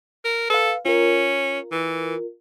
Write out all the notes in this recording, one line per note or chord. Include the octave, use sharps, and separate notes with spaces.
A#4
A4 B4 F5
C#4 F4 A#4
E3